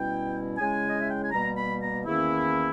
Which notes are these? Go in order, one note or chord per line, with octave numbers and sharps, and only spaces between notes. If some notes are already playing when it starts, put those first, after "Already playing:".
Already playing: B2 G3 C#4 E4 G5
C#3 G#3 C#4 E4 G#5
D#5
E5
G5
G#5
B2 G3 A#3 A#5
B5
A#5
E2 D#3 A#3 C#4 E4